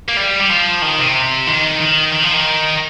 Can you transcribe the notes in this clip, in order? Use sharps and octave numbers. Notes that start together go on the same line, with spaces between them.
A#3
G3
G3
F3
D#3
C3
D#3
D#3
D#3
F3
D#3